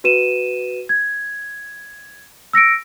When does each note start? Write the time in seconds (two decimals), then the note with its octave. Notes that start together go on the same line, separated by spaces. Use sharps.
0.04 F#4 B4 D#7 E7
0.89 G#6
2.53 E6 A#6 C#7 D7